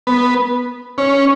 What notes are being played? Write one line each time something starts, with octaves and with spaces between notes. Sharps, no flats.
B3
C#4